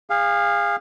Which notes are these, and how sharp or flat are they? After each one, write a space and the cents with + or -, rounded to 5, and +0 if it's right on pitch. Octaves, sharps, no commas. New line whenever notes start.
G#4 -35 F5 +0